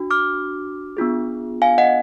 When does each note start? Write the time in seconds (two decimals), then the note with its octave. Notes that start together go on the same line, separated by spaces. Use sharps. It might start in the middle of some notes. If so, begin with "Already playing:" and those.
Already playing: D4 F#4
0.11 D6 F6
0.97 B3 D4 F4 G#4
1.62 F5 G#5
1.78 D#5 F#5